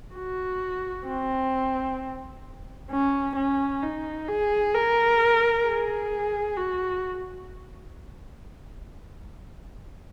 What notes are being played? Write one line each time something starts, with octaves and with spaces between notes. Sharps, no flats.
F#4
C4
C#4
C#4
D#4
G#4
A#4
G#4
F#4